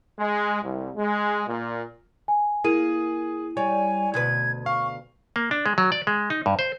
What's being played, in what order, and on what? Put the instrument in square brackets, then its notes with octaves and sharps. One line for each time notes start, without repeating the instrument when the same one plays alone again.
[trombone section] G#3
C2
G#3
A#2
[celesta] G#5
[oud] A#3 [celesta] E4 D#7 [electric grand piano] G#4
[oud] G3 [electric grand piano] C#5 [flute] G#5
[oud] D2 B2 B4 [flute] G#6
[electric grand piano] F5 [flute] C#6
[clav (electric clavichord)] A#3
D4
G#3
F#3
D5
G#3
D#4
G2
C5